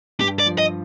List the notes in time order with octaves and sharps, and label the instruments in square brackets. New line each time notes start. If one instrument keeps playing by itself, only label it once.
[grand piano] G2 [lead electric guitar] G4
[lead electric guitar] D5
[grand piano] F3
[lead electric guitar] D#5